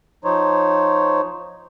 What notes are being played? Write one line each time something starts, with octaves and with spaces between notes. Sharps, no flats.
F3 D#4 C5 C#5